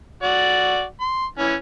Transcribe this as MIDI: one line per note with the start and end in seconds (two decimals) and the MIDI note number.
0.23 0.83 66
0.23 0.83 74
1.01 1.25 84
1.38 1.54 52
1.38 1.54 61